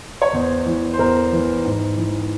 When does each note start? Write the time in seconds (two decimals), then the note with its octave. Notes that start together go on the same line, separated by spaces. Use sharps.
0.22 C#5
0.33 E2 C5
0.66 E3
0.93 C5
0.99 E2 A#4
1.33 E3
1.65 G#2
1.97 E3